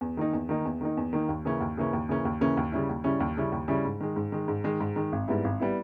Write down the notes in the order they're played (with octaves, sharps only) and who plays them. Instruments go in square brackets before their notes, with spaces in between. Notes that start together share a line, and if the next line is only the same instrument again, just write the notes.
[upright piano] E2
D#3 A#3 D#4
E2
D#3 A#3 D#4
E2
D#3 A#3 D#4
E2
D#3 A#3 D#4
D#2
C#3 E3 A#3 C#4
D#2
C#3 E3 A#3 C#4
D#2
C#3 E3 A#3 C#4
D#2
C#3 E3 A#3 C#4
D#2
C#3 G3 C#4 E4
D#2
C#3 G3 C#4 E4
D#2
C#3 G3 C#4 E4
D#2
C#3 G3 C#4 E4
G#2
D#3 G#3
G#2
D#3 G#3
G#2
D#3 G#3
G#2
D#3 G#3
G#1
G#2 G3 B3 E4
G#1
G3 B3 E4